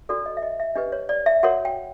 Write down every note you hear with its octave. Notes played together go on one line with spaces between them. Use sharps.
D4 F#4 A4 D5
D#5
E5
D#5
E5
D4 G4 B4 D#5
C#5
D5
E5
F#4 A#4 C#5 F#5
G5